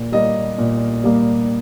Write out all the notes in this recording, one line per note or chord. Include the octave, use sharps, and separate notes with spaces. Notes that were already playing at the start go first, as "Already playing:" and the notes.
Already playing: A#2
G3 A#3 D#5
A#2
G3 A#3